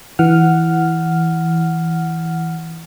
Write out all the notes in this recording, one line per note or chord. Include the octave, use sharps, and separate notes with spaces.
E3 F#5 F6